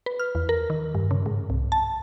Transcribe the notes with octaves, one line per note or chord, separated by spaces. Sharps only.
B4
F6
E2
A#4
D#3
G2
C#3
G#2
C2
A5